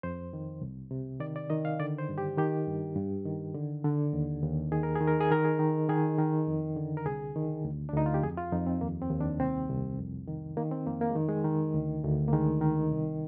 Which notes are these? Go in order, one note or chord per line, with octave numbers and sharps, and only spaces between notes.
F2 C5
D#3
C2
C3
D#3 D5
D5
D#3 D#5
F5
D3 D5
C5
G2
G4
D#3 G4
G2
G2
D#3
D3
D3
D#2
D#2
D#3 G#4
A#4
G#4
D#3
A#4
G#4
D#3 A#4
G#4
D#3
D#3 G#4
D#3
F2
D3
A#4
C2 G#4
D#3
D2
D4
D2 D#4
F4
G4
F2 G#4
F4
F2 D#4
C4
D#2 A#3
C4
D#2
D4
C2 C4
C2
F2
D#3
D#3 A#3
C4
F2 A#3
A#3
G#3
D#3
G#3
D#3
D2
D2
A#3
D#3 G#3
D#3
C2